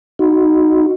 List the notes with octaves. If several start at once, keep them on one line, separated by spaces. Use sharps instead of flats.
D#4 F#4